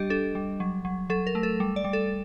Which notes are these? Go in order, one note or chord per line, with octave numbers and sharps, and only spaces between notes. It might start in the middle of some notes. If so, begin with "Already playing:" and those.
Already playing: G3 D4 G4 D#5
D4 A4
G3
F#3
F#3
F#3 A4
A#4
A3
A4
G3
D5
G3
A4